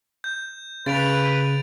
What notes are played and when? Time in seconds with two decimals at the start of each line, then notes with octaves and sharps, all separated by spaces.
0.24 G6
0.86 C#3 B4 A6 D7 F7